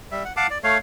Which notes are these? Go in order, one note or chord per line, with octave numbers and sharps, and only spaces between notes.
G3 E5
F#5
F5 F#5 A5 D6
D5
A3 C#5 F5